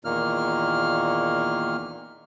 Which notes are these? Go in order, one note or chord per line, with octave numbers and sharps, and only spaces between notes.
E2 A#2 D#3 A#3 F6